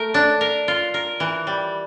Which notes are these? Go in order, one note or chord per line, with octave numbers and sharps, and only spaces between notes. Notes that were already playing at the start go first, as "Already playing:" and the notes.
Already playing: A3 A#4
D4
A#4
F4
A#4
E3
G3